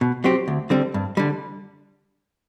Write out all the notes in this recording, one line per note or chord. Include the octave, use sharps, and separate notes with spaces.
B2
F#3 C4 G4
D2
D3 G3 C4
G2
D3 G3